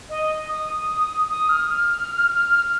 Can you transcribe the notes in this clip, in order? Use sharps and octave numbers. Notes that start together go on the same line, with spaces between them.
D#5
D#6
D#6
F6
F6